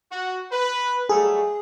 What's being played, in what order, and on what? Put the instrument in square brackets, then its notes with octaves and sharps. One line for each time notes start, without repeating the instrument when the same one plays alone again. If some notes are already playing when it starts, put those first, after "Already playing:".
[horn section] F#4
B4
[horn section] F#3 G3 A3 [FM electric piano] G#4